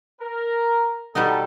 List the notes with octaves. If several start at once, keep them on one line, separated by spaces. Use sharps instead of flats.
A#4
B2 G3 B3 D#4 A4